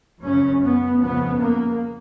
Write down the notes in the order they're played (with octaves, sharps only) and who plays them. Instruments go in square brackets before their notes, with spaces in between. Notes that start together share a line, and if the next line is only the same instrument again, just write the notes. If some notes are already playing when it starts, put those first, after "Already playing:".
[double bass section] F#2 C#3 C#4
B3
F2 C#3 B3
A#3